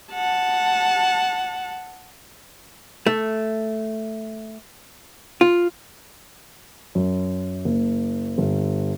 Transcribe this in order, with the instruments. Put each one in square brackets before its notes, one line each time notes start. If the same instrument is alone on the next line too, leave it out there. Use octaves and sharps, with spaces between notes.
[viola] F#5 A5
[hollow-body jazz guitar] A3
F4
[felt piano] F#2
F#1
G1